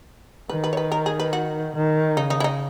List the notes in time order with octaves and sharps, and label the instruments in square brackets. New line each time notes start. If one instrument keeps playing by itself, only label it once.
[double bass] D#3 [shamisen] B4
[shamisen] B4
C#5
B4
A#4
G#4
B4
F#4
[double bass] D#3
[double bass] C#3 [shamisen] D#4
[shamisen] D#4
E4
D#4